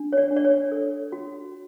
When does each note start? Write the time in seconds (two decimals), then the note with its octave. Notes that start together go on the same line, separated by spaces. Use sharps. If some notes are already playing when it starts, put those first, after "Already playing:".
Already playing: D4
0.13 C#5
0.17 D5
0.31 D4
0.37 D5
0.45 C#5
0.72 A4
1.12 F#4